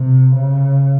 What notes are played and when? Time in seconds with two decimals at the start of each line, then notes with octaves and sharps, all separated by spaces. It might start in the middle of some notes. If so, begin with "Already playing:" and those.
Already playing: C3
0.35 C#3